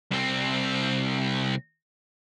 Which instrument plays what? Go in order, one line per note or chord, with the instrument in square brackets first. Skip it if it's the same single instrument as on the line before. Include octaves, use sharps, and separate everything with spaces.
[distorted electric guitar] C2 C4